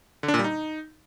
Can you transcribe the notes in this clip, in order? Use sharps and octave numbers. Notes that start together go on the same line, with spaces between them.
D3
D4
A#2
G3
D#4